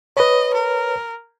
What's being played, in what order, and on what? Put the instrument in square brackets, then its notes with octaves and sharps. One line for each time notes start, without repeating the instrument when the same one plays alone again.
[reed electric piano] B4 C#5 [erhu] D#5
[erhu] A#4